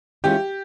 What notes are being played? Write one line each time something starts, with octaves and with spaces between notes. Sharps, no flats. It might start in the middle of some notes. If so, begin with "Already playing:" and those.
E3 G#3 C#4 F4 G4